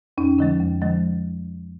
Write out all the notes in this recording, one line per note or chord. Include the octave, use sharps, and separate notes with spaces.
F2 C#4 D#4
D3 F3 G#3
F2
D3 F3 G#3